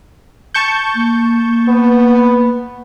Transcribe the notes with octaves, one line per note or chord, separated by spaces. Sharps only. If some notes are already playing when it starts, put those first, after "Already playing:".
A5 C#6 G6
A#3
B3